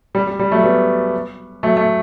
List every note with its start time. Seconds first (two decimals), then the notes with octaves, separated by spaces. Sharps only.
0.15 G3
0.27 G3
0.39 G3
0.52 F#3 A3
0.64 G3 B3
1.63 F#3 A3
1.77 A3